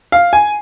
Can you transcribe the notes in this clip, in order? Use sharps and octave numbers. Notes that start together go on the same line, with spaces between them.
F5
G#5